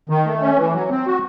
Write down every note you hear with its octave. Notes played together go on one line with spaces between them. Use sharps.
D#3
A3
C#4
E3
F#3
C4
F#4